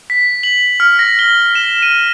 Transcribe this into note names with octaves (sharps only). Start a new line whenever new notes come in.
B6
F#7
F6
A#6
G7
E7
D#7